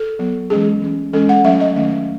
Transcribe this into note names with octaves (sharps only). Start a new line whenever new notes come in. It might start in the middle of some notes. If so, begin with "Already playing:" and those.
Already playing: A4
F#3 B3
E3 G#3 C#4 G#4
E3 A3 C#4
E3 G#3 C#4 A4
F#5
F#3 A3 C#4 E5
D#5
D#3 A3 C#4